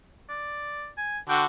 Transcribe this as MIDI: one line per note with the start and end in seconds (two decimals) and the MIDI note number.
0.29 0.89 74
0.98 1.19 80
1.29 1.45 50
1.29 1.45 66
1.29 1.42 79